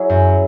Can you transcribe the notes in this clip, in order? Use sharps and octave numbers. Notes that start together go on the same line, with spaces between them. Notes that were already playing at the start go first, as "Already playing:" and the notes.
Already playing: F#3 E4 G#4
F#2